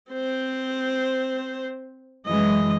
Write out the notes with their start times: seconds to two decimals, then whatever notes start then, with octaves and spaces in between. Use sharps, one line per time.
0.11 C4 C5
2.26 F#2 E3 G#3 D#5